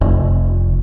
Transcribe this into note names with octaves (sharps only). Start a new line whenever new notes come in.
F1